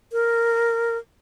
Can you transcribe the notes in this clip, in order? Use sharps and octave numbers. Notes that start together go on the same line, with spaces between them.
A#4